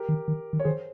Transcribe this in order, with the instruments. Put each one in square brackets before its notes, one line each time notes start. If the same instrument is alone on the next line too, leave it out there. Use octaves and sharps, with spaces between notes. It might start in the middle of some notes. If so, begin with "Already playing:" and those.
Already playing: [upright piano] G4 A#4
[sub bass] D#3
D#3
D#3
[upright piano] C#5
[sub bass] D#3 [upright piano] G#4 C5